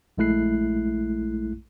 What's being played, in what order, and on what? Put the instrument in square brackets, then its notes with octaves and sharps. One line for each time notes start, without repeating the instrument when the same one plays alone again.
[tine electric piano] A#1 G#3 A3 E4 F#6 C7